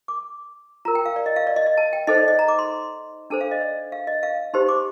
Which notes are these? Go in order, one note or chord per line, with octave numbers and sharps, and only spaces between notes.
D6
F4 A#4 A#5
G5
F5
D5
D#5
F5
D5
D#5
D#5
A5
G5
D#4 A4 C5 D#5
D5
D#5
A#5
D6
C6
D4 A4 C5 A5
F5
D#5
D5
F5
D#5
F5
D#4 G4 C5 C6
D6